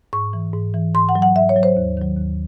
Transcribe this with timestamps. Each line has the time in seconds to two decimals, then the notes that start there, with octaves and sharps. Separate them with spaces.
0.13 G#2 C#6
0.33 E3
0.53 G#2
0.74 E3
0.95 G#2 C6
1.09 F#5
1.15 F#3
1.22 F#5
1.36 G#2 E5
1.49 C#5
1.56 F#3
1.63 C5
1.77 D#2
1.97 D#3 F#3
2.17 D#2